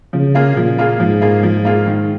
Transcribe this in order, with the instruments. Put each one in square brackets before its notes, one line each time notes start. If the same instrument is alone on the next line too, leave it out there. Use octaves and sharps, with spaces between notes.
[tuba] C#3 [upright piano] F3
[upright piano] A#3 F4 G#4
[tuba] A#2 [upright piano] F3
[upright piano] A#3 F4 G#4
[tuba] G#2 [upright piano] F3
[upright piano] A#3 F4 G#4
F3
A#3 F4 G#4
D#3